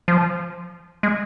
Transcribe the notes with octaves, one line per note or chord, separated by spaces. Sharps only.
F3
G#3